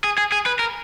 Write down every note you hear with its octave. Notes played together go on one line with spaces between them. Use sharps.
G#4
G#4
G#4
B4
A#4